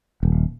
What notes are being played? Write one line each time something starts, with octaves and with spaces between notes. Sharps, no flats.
D#1